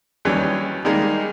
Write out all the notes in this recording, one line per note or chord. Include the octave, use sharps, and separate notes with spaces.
D#2 E3 F#3 G3 C#4
D#3 G3 G#3 A#3 D#4